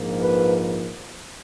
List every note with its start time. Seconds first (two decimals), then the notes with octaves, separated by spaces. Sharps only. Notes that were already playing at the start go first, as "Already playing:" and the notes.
Already playing: A#1 G#2 F3 A#3
0.21 B4